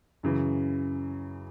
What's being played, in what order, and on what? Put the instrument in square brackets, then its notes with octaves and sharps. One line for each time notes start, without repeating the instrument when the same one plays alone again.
[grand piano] F#2 C#3 E3